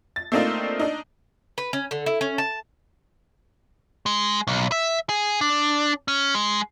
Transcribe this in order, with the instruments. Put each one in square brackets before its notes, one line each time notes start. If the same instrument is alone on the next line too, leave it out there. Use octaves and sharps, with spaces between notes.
[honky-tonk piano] A6
A3 A#3 C4 D4 D#4 F4
D4 D#4
[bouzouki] B4
C#4
D3
E4
C#4
A5
[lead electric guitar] G#3
B1
E5
G#4
D4
C#4
G#3